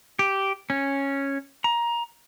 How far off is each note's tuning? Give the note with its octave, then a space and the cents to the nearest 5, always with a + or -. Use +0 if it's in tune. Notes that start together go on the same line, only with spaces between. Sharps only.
G4 -10
C#4 -5
A#5 +15